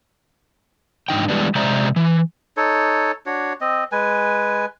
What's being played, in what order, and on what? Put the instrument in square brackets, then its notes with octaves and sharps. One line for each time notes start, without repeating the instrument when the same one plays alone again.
[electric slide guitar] G#2 D4 D#4 G5
E3 G3 G#3 B3 D4
C3 G#3 C5 D5 E5 A#5
E3
[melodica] D#4 A4 C#5
D4 F#4 C#5
C4 D#5
G#3 B4 G#5